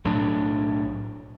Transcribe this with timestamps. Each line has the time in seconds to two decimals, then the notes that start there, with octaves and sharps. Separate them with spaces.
0.05 B1 A2 F#3 D4